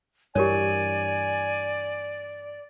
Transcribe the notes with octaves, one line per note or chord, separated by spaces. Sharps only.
G2 E3 G4 A#4 C#5 D5 G#5